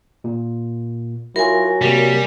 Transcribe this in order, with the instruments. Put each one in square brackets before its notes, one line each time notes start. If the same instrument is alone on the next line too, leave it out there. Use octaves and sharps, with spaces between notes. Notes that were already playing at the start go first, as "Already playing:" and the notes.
[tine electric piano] A#2
[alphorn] F#3 [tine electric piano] E4 F4 [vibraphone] A#4 G#5
[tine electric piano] C3 A#3 [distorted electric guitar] G3